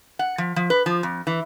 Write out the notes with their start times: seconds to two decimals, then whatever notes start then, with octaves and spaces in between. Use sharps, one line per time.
0.19 F#5
0.38 F3
0.56 F3
0.70 B4
0.86 F3
1.03 F2
1.27 E3